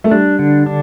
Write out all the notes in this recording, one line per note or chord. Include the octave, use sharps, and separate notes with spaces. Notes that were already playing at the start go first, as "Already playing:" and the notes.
A3
G3 D4
D3
D4